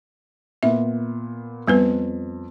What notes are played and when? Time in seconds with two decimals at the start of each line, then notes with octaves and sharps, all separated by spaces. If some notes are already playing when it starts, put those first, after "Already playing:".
0.63 A#2 B3 E5
1.68 F2 G3 B3 B4